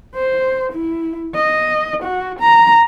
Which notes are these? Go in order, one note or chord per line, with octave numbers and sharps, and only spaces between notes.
C5
E4
D#5
F#4
A#5